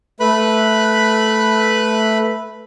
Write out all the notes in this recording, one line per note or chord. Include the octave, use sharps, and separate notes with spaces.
A3 B4 B5 F#6